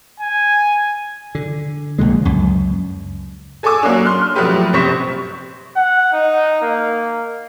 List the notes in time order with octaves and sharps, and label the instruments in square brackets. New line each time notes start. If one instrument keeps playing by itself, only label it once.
[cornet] G#5
[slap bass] D3
A#1 A#2 D3 G#3
C#2 F#2
[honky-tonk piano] G#4 A4 G#5 C#6 D6 E6
F#3 A#3 C#4 D4
C6 F6 F#6
C#3 F3 F#3 A3 G4 B4
A#1 C3 C5 C#6 B6
[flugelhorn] F#5
D#4
A#3